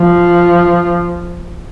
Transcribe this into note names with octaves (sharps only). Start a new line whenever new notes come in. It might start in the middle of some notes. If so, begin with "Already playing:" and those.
Already playing: F3